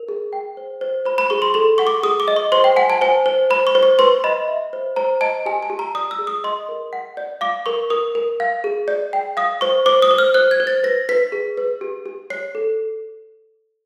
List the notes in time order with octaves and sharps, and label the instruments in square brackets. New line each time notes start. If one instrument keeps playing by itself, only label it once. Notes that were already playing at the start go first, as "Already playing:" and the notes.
Already playing: [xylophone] A#4
G#4
G5
C5
C5
C5 B5
B5
G#4 C#6
C6
A4 C6
F#5 C#6
D6
G#4 D#6
D6
D#5
C#6
C5 C6
G5
F#5 G#5
A5
C5 G#5
C5
C5 B5
C#6
C5
C#6
B4 C6
D#5 B5
E5
C5
C5 A#5
D#5 A5
G4 G#5
A5
G4
A#5
D5 D#6
E6
G#4
D#6
D#5 C6
A#4
F#5
D5
F5 D6
A#4 C#6
A#4 D#6
A#4
F5
G#4
D5
G5
F5 D#6
C5 C#6
C5 D6
D#6
C5
F6
C5 F#6
G#6
C5
A6
B4 A#6
B4 B6
G#4
B4
G4
G4
C#5 C7
A4